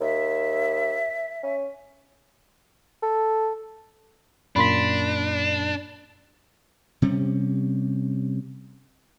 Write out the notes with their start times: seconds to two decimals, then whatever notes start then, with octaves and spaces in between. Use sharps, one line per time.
0.01 D#2 E5
1.43 C#4
3.03 A4
4.56 F#2 A#2 A#3 D4 B5 C6 B6
7.02 C3 G3 C#4